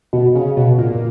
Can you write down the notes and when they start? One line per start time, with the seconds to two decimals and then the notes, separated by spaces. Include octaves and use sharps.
0.13 B2
0.35 C#3
0.57 B2
0.78 A#2